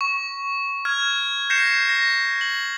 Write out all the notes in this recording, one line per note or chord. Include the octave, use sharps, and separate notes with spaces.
C#6
F6 G#6
G6 A#6 C7 C#7 E7
A#6
F#7